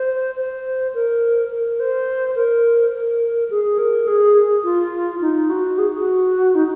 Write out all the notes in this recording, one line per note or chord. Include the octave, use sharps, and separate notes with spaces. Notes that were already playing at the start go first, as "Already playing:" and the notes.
Already playing: C5
C5
A#4
A#4
C5
A#4
A#4
G#4
A#4
G#4
F4
D#4
F#4
G#4
F#4
D#4